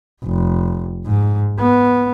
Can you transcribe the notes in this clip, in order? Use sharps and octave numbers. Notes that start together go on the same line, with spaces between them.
F1
G#2
B3